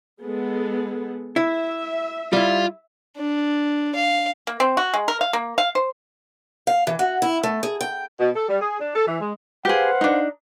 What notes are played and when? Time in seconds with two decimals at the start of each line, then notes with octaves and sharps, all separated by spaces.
0.21 G#3 B3 A4
1.36 E4 E5
2.33 G3 E4 F4
3.17 D4
3.95 F5
4.47 A#3
4.60 C4
4.77 F#4
4.94 G#3
5.08 A#4
5.21 F5
5.33 A#3
5.58 F5
5.75 C5
6.67 F5
6.87 E3
6.99 F#4
7.22 E4
7.43 A3
7.63 G#4
7.81 G5
8.20 B2
8.35 A4
8.48 G3
8.60 G#4
8.79 D4
8.94 A4
9.06 E3
9.20 G#3
9.65 G4 G#4 B4 C5 F5 F#5
10.01 D4 D#4